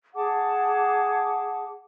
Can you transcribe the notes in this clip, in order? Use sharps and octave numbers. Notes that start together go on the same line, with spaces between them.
G#4 F#5 A5 D6